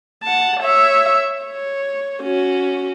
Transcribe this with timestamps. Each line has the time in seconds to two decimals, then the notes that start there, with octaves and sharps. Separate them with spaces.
0.23 F#5 A5
0.60 C#5 E5
1.43 C#5
2.23 C#4 F#4